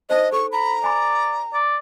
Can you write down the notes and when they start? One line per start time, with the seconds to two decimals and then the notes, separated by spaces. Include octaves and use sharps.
0.10 D4 D#4 C5 D#5
0.32 A4 C#6
0.52 A#5 B5
0.84 D5 G#5 B5
1.54 D5